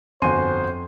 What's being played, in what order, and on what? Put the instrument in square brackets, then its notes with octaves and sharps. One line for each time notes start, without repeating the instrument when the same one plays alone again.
[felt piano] G1 F#4 G#5 [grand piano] F2 C6 D#7 [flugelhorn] C5